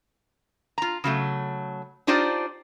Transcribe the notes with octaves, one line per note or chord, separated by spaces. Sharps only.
F4 A#5
C#3 F#3 A3
D4 D#4 F4 G4 C5 D5